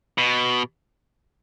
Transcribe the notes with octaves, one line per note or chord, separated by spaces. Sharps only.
B2